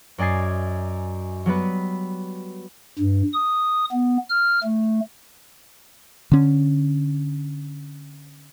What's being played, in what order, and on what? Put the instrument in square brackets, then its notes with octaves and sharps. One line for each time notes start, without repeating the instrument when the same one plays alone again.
[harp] F#2 D5 D#5 G#5 A6 C7
F#3 G3 B3 B4
[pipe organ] G2
D#6
B3
F6
A3
[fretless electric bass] D3 C#4